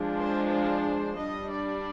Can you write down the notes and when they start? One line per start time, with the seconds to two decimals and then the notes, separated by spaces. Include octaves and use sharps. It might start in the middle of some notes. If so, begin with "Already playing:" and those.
Already playing: F3 G#3 D4
0.19 C5
0.53 C5
1.18 G3 D4 D#5
1.51 D5